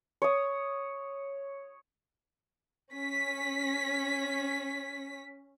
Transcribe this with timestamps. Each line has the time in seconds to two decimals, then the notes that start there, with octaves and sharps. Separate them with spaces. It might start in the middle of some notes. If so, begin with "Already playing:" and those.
0.22 C#5 D#6
2.94 C#4 B6